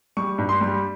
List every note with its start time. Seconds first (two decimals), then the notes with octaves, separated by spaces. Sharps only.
0.17 G3 C#6
0.38 G2
0.49 C6
0.61 G3